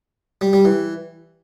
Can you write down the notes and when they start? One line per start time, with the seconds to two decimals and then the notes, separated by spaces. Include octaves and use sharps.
0.41 G3
0.53 G3
0.65 E3